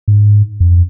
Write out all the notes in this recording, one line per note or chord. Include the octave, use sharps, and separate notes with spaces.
G#2
F2